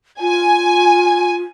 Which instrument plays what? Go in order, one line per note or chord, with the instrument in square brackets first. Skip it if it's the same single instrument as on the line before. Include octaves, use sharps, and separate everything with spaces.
[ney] F4 [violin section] G#5